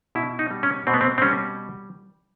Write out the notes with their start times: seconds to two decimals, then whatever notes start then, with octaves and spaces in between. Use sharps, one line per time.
0.15 B2 E4
0.39 D#4
0.51 G3
0.63 C#4
0.87 B2 C4
0.94 B3
1.01 C4
1.18 C4
1.22 G3 C#4